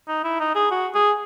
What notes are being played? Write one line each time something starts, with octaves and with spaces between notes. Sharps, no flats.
D#4
E4
D#4
G#4
F#4
G#4